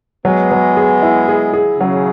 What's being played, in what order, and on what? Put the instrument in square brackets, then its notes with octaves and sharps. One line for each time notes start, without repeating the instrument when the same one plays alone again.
[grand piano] F#3 [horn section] G#3 B3
[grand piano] F#3
G#4
E4
G#4
G#4
[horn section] C#3 [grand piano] F#3